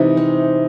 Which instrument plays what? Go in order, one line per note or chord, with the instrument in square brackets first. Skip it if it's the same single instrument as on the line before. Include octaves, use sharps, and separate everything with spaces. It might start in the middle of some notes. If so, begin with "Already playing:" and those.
Already playing: [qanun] C3 E3 G#3 [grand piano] D#4
[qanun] C4